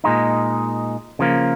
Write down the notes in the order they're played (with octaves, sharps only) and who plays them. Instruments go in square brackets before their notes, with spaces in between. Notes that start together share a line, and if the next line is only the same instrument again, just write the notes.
[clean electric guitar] A#2 G#3 D#4
C#3 F3 A#3